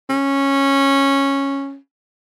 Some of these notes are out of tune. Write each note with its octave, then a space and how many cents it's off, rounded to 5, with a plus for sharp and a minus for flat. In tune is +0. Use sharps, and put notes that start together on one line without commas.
C#4 -10